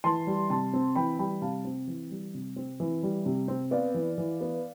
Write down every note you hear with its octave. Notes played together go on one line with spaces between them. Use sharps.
E3 A5 C6
G3
C3 A5 C6
C4
E3 G5 B5
G3 G5 B5
C3 F5 A5
C4
E3
G3
C3
C4
E3
G3
C3
C4
B3 D5 F5
E3
E3
B3